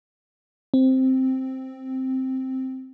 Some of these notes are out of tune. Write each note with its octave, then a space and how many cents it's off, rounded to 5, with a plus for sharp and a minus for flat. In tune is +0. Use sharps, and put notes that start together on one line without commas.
C4 +0